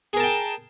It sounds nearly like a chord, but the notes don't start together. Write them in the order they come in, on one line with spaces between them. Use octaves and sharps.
G#4 A#4 A5 G5